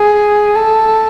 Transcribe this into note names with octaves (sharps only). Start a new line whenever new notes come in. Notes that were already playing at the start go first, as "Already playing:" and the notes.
Already playing: G#4
A4